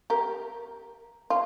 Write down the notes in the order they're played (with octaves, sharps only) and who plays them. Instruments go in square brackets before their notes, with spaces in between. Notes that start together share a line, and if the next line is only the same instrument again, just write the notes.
[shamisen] G4 A#4
F4